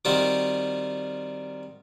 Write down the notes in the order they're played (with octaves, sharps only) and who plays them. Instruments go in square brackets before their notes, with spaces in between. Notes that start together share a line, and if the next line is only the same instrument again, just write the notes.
[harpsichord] D#3 G3 C4 F4 F#4 C5